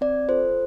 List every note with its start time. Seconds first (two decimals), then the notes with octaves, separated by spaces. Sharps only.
0.01 C4 D5
0.29 F4 A4 C5